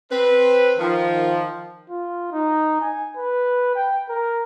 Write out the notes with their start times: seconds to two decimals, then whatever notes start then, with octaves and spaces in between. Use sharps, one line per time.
0.11 C4 B4
0.78 D#3 F3
1.89 F4
2.32 D#4
2.82 G#5
3.17 B4
3.76 G5
4.09 A#4